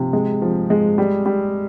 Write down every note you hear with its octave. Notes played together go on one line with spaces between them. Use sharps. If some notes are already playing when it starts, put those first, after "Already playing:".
Already playing: C3 F3
G#3
F3
G#3
G3
G3